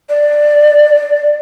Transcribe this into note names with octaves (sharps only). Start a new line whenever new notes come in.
D5